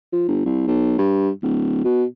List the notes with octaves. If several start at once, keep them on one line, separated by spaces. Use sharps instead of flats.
F3
G1
C2
B1
G2
D1
B2